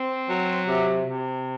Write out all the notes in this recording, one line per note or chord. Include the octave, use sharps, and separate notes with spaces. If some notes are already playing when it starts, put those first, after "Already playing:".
Already playing: C4
F#3
C3
C3